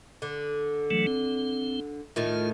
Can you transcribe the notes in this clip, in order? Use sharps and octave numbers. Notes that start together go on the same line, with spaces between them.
D3
E3 F#3 A3
C4
A2 D#3 A3 F4